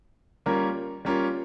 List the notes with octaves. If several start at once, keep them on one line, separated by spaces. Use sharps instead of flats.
G3 A#3 C#4 F4 A#4
G3 A#3 C#4 F4 A#4